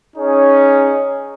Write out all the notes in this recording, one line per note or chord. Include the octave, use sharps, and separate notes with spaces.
C#4 D#4 G#4 C#5